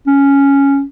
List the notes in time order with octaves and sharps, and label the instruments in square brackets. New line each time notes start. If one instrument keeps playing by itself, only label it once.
[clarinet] C#4